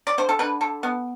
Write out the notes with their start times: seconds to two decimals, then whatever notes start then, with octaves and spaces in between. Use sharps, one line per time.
0.07 D5
0.18 D3 C5
0.29 A4
0.39 D3 B4
0.61 D3 A4
0.83 B3